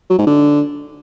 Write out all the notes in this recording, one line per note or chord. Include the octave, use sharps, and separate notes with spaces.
F#3
G#2
D3